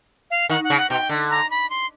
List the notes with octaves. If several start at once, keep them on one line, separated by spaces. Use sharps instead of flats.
F5
D#3 F#5
F#5
C#3
F#5
B2 G5
D3
A#5
B5
C6